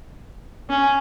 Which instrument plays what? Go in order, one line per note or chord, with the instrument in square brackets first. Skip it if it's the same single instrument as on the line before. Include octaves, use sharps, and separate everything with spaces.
[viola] C#4